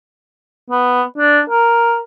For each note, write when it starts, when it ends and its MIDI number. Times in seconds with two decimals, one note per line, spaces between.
0.70 1.02 59
1.18 1.40 62
1.50 2.00 70